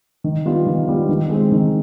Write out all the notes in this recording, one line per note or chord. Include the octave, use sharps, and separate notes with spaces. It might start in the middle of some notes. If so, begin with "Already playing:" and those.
D#3
G3 B3 F4
D#3
G3 B3 F4
D#3
G#3 C4
D#3